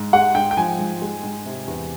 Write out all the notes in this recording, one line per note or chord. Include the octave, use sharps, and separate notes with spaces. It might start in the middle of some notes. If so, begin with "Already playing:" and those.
Already playing: G#2
G#3 F#5
G#2 G5
G5
F3 G#5
G#2
G#3
G#2
C3
E2